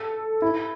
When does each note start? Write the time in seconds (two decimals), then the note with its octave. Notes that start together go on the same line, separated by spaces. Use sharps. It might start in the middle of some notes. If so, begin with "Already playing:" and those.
Already playing: A4
0.42 E4